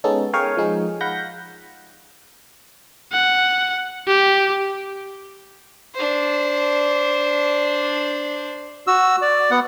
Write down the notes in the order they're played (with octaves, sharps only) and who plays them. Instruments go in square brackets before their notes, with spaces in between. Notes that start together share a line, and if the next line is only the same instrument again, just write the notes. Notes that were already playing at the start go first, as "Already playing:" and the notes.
[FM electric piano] G#3 B3 C#4 D#4 A4
G#4 A#4 C#5 F5 G5 G#5
F3 G#3 D#4 G#4
F5 F#5 B5 G6 A#6
[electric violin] F#5
G4
[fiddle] D4 C5
[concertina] F#4 E6
D5
B3 F#5